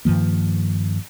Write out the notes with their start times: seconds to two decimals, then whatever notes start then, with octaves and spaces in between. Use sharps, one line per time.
0.05 G2 D#3 F3 A#3